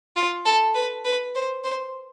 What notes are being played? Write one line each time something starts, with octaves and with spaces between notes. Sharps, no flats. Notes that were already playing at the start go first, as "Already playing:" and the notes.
F4
A4
B4
B4
C5
C5